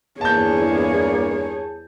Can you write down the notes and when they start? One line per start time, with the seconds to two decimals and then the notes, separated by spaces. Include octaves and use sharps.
0.21 E2 G2 A#2 A#3 G#4 C#5 A5 G6